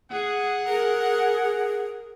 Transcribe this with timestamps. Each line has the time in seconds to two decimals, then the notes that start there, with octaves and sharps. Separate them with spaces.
0.11 G#4 F#5
0.68 G#4 A#4